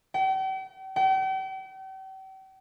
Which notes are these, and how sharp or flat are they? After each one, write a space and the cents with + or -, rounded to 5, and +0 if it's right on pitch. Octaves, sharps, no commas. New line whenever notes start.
G5 -40
G5 -40